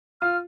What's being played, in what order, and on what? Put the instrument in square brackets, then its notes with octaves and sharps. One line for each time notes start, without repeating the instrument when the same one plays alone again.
[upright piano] F4 [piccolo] F6